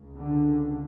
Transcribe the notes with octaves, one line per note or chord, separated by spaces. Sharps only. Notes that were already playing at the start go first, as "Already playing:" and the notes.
Already playing: C#2 C#3
D3